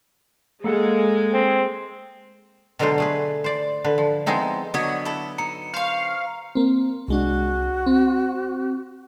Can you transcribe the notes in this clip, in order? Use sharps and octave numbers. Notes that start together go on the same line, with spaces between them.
G#3 A#3 A4 F#5
C4
B2 D3 F#3 G#3 D4 C5
A3 G#4 B4
C5 D5
D3 B4
F3
F3 G#3 B3 C4 D#4 E4
D3 F#3 B3 C#5 D#5
E4 A4
D#4 A#5 C#7
C5 F5 C#6
A#3 C4
C2 G#3 D4 F#4
C4